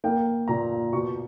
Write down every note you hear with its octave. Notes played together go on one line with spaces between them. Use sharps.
A#3 G5
A#2 A#5
B2 C#6